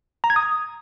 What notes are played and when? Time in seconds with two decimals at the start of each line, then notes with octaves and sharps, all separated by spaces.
0.24 A#5
0.30 G#6
0.36 D#6